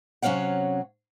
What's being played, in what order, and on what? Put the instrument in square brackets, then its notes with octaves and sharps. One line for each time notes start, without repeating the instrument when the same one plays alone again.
[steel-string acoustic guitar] C3 F#3 C#4 C#5 F5 F#5